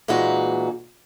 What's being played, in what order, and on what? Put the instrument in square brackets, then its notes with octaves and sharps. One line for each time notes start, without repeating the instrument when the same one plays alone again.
[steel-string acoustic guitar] A#2 E3 G#3 D#4 F#4